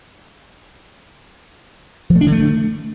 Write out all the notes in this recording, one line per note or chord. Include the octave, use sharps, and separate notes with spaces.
F3
A3
D4
D3
A3